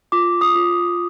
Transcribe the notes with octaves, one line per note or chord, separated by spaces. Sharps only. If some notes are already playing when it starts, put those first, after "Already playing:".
F4 D6
D#6
F4